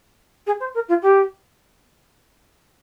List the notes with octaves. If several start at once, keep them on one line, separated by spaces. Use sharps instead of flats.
G#4
C5
A#4
F4
G4